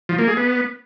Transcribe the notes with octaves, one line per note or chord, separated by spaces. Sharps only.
F3
A#3
G#4
B3